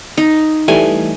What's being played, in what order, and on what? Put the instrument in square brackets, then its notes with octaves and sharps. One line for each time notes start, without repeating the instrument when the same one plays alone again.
[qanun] D#4
[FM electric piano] E3 G3 A3 [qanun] G#5